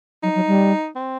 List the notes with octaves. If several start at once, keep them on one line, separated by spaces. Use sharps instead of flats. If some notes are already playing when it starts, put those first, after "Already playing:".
F#3 D#4
F#3
G3
C4